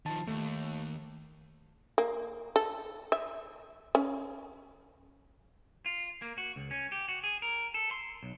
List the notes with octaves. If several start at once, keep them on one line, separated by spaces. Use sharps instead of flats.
D#3 F3 A5
D#2 A3
A#3
A4
E5
C#4
F4
A#3
F#4
C#2
C#4
G4
F#4
G#4
A#4
A4
C6
B1